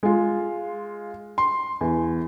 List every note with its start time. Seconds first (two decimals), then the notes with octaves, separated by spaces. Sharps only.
0.03 G#3 F4
1.38 C6
1.81 E2